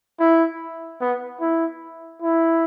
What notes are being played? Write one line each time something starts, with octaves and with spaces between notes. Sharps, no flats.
E4
B3
E4
E4